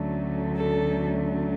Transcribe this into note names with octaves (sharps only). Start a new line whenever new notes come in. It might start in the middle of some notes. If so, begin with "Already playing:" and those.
Already playing: D2 D3 F#3 A3 C#4
A4